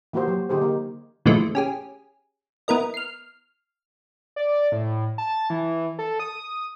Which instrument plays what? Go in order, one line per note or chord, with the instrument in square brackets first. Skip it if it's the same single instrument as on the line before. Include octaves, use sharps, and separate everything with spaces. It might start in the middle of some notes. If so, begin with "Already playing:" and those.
[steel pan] E3 A#3 F#4 G4 C5
F#3
D3 D#4 G4 G#4 C5
A#3 D#4
[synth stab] A#2 D3 E3 F3 G#3 A3
C#4 G4 G#4
B3 E4 A#4 D#5
F6 C7
[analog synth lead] D5
A2
A5
E3
A4
D#6